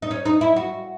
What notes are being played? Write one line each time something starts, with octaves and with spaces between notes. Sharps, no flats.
D#4
C#4
D#4
E4
F#4